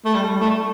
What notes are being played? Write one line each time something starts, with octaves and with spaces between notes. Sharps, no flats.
A3
G3
G3
A3